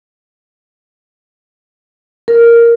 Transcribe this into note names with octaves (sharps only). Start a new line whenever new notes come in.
A#4